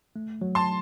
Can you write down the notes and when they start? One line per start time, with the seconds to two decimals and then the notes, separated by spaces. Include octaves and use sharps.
0.16 A3
0.42 F#3
0.55 A5 C6